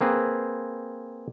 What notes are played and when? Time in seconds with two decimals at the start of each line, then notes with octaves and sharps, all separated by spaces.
0.01 A#3 C4 G#4 B4